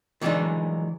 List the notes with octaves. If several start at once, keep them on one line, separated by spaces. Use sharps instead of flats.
D#3 E3 F#3 G#3 D4 D#4